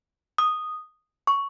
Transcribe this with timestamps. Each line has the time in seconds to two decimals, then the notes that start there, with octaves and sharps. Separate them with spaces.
0.38 D#6
1.27 C#6